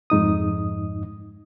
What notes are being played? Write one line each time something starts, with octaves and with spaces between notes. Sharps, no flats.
F2 G#2 D#4 D#6